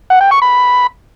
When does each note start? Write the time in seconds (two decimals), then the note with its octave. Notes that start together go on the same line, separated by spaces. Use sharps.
0.10 F#5
0.21 G5
0.31 C#6
0.42 B5